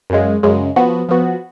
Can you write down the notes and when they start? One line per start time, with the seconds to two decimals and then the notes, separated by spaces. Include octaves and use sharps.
0.10 F#2 C#3 G#3
0.43 F#2 C#3 G#3
0.76 F3 B3 F#4
1.09 F3 B3 F#4